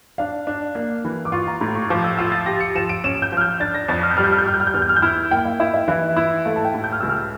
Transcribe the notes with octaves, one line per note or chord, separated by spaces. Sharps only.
D4 F5
D4
A#3
E3
D6
F4 C#6
A#5
A2 A#5
C#6
F3 D6
E6
F4 E6
A6
G4 A#6
C#7
F3 E7
D7
C#4 E7
G6
F3 F6
G6
D4 A6
A#6
F2 A6
F6
G6
G3 F6
G6
F6
G6
G3 F6
G6
F6
G6
E2 F6
G6
F6
G6
E4 F6
A#3 G5
F5
E4 E5
E5
E3 E5
E4
A3 F5
A5
G5
A2
G6
F6
C#2 E6
F6